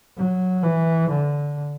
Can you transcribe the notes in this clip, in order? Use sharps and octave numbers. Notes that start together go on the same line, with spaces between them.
F#3
E3
D3